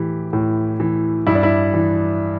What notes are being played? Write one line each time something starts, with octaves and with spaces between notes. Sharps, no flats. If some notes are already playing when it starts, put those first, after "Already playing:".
Already playing: A2 E3 G4
A2
E3
G2 E4
D4
E4
E3